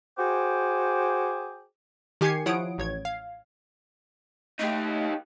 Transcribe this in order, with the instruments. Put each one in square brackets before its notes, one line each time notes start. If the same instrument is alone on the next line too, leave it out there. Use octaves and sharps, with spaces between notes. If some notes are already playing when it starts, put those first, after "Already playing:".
[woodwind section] F#4 G#4 C5 G5 D6
[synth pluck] D#3 G4 G#5 G#6 C7 C#7
F3 E4 C#5 F#5 D#6 D7
A1 C#5 G#6
F5
[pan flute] A3 [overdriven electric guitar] D#4 G4